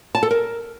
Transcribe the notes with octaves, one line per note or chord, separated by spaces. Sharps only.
A5
A4
A#4